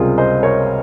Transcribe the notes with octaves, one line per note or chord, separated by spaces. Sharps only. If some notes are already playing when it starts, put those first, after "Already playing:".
Already playing: C#2 C3 G3 A#3 F4 G#4
C5 D#5
A#4 C#5